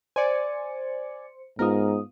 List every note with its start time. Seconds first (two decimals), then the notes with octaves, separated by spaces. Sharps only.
0.16 C5 D5 G#5 C#7
1.59 G#2 B3 F4 A#4 D#6